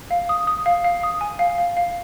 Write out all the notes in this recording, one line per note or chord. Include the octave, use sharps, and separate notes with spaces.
F5
D#6
D#6
F5
F5
D#6
G#5
F5
F5
F5